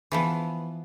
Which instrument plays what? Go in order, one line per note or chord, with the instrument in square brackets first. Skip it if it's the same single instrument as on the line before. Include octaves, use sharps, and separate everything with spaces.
[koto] E3 F3 B3